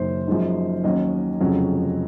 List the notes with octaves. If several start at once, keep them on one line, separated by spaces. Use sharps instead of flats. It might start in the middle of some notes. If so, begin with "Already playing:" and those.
Already playing: F#1 F#2 D#3 C5
F#2 F3 G#3 D#4
D#2 D#3 F#3 C#4 D#5
F1 F2 C#3 F#3 C#4